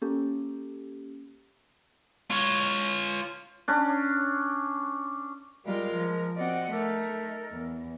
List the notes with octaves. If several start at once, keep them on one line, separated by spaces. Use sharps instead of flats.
A#3 C#4 G4 A4
F4 C#5
C#4 D4
G3 G#3 F4 A#4
F3
C4 F#4 D5 D#5 F#5
A3 D#4 A4 A#4
E2